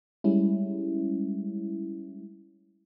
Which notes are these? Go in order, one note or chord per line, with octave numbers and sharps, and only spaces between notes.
G3 G#3 C#4 E4